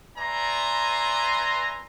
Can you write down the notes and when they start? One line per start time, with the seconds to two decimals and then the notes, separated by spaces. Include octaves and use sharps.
0.17 B4 D5 E5 G#5 A#5 C6